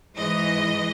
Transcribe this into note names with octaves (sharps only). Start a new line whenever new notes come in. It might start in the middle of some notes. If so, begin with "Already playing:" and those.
G#2 E3 G#3 D#5